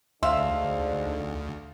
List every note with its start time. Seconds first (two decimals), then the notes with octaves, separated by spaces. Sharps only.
0.23 D2 G#2 D3 E5 F5 C6